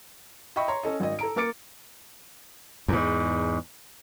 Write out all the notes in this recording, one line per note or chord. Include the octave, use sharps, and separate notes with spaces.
D#5 E5 G5 B5 C#6
C#5 A#5 C6
C#4 A4 D#5
G#1 D#5
A4 A#5 D7
A#3 A#4 D6 A6 C#7 D7
E2 G#2